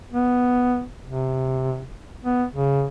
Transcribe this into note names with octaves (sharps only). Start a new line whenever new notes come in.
B3
C3
B3
C#3